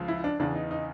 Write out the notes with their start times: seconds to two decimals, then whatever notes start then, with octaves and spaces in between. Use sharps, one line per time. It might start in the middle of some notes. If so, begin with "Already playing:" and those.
Already playing: C#2 C#3 F3
0.08 E4
0.24 D4
0.40 E2 C#3 E3 D4
0.55 D#4
0.71 D#4